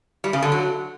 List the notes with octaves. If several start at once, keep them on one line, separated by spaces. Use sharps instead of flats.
G3
C#3
D3
F#3